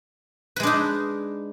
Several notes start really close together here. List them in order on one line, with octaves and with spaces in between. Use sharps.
B4 G#3 D4 D#4